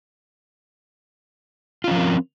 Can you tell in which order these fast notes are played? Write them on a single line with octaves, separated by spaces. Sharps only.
F4 C#4 F3 A#4 C4